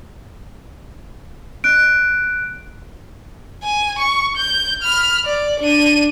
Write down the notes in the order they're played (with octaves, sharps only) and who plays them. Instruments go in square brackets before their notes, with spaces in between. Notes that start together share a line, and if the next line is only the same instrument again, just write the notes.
[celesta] F#6 D7
[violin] G#5
C#6
G6
B5 F6
D5
D4 D#7